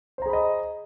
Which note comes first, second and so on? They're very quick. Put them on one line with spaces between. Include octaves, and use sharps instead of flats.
C5 A#5 G#4 B5 D#5